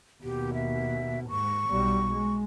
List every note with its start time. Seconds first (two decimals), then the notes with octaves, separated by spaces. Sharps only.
0.23 D#2 B2 G4
0.54 E5
1.29 G#2 C#6
1.69 B1 G3
2.11 G#3